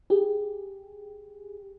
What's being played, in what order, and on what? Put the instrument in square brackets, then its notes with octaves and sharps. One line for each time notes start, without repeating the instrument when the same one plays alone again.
[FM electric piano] G4 G#4